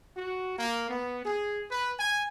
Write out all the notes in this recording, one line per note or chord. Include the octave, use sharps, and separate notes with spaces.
F#4
A#3
B3
G#4
B4
G#5